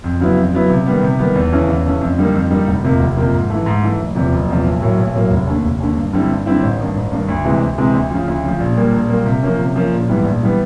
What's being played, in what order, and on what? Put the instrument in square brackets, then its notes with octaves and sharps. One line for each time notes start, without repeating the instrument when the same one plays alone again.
[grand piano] F2
C#3 F#3 B3 E4
F2
C#3 F#3 B3 E4
C3
D#3 G3 B3
C3
D#3 G3 B3
E2
C#3 E3 A3 C#4
E2
C#3 E3 A3 C#4
F2
D3 G3 A#3 D#4
F2
D3 G3 A#3 D#4
F1
F2 C3 F3 A#3
F1
F2 C3 F3 A#3
G#2
E3 A3
G#2
E3 A3
F#1
E2 C3 F3
F#1
E2 C3 F3
B1
A2 F#3 A#3
B1
A2 F#3 A#3
F1
D#2 D3
F1
D#2 D3
G2
D3 G3 C4 E4
G2
D3 G3 C4 E4
A1
G2 D#3
A1
G2 D#3
D2
C3 E3 G#3 C4
D2
C3 E3 G#3 C4
D2
C#3 F3
D2
C#3 F3
A#1
A#2 G3 A#3
A#1
A#2 G3 A#3
C3
F3 A#3 C#4
C3
F3 A#3 C#4
A#1
G#2 E3 G3 B3
A#1
E3 G3 B3